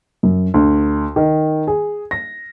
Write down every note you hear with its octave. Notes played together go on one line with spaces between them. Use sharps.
F#2
D2
D#3
G#4
A#6